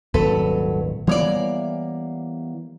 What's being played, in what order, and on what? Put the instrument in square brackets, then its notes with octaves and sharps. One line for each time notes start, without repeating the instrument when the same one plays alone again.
[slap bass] D#1 G#1 [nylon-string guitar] F#3 A4 B4
[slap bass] E3 G3 B3 [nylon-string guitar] A#3 C#5 D5